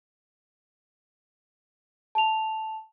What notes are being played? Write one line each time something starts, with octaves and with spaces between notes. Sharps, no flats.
A5 F7